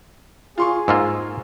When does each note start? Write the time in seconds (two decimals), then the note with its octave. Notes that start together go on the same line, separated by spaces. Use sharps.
0.58 F4 G#4 C6 C#6
0.88 G#2 A#3 F4 E6